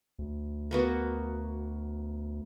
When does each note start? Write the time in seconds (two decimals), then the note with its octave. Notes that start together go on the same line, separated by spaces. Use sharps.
0.19 D2
0.71 A#3 B3 F#4